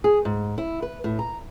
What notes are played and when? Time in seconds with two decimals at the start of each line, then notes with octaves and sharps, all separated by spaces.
0.04 G#4
0.25 G#2
0.58 E4
0.82 B4
1.04 A2
1.19 A#5